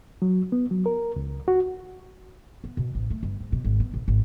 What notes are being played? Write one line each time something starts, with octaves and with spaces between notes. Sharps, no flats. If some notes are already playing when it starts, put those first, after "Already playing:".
F#3
B3
F#3
A#4
C#2
F#4
B3
B2
A1
A3
G1
G#2
B2
G#1
B3
A#1
G#1